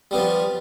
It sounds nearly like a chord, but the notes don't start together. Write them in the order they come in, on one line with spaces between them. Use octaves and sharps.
G3 B3 F3